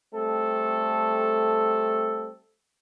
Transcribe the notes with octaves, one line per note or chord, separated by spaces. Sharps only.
G3 A3 C4 A4